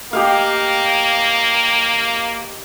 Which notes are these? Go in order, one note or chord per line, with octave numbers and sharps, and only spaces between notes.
A#3 G4 D#5 F5